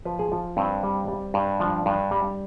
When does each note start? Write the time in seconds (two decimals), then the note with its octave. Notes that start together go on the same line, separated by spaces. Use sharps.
0.05 F3 B4
0.19 G#4
0.32 F3
0.57 G2 C4
0.83 G3
1.08 G3
1.34 G2
1.60 F3 D4
1.86 G2
2.11 G3